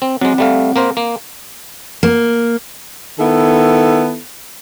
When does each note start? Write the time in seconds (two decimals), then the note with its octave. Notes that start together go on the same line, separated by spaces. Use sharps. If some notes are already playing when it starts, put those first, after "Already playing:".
0.02 C4
0.21 F#3 G#3 C4
0.38 G3 A3 F5
0.76 A#3 A#4 C5
0.97 A#3
2.03 A#3
3.19 D#3 B3 E4 A4